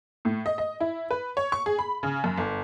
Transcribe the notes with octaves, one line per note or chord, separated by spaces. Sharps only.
A2
D#5
D#5
E4
B4
C#5
C#6
G#4
B5
C#3
F#2
G1